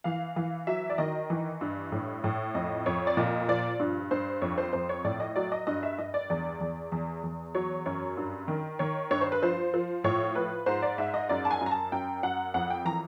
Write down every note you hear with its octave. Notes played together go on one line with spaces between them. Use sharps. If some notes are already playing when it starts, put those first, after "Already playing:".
E3 F5
E3 F5
F#3 E5
D5
D#3 D#5
E3
G2
A2
A2
F2 D#5
F2 C#5
D5
A#2 D#5
F3 D5
G2
G2 C5
F2 C#5
C5
F2 C5
C#5
A2 D5
D#5
F#3 D5
D#5
G2 D#5
E5
G2 D#5
D5
E2 D5
E2
E2
E2
F#3 C#5
F#2 C#5
G2
D#3
D#3 C#5
G2 C#5
C5
B4
F3 C5
F3
A2 C#5
F3 B4
G#2 C5
D5
G#2 E5
D#5
F#2 D5
A5
G#5
F#2
A#5
A5
F#2 G5
F#2 F#5
F2 F#5
G5
E3 A#5